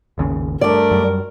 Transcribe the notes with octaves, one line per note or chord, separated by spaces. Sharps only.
G#1 D#2 C#3
G2 A3 A#4 D5
F#2 F#3 G3